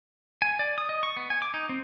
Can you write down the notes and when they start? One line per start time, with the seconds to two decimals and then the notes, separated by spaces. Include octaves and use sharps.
0.42 G#5
0.59 D5
0.78 D#6
0.89 D#5
1.03 C#6
1.17 B3
1.30 G#5
1.42 D6
1.54 D#4
1.69 C4